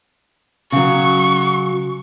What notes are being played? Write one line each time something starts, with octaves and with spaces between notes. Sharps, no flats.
C#3 F#3 C#6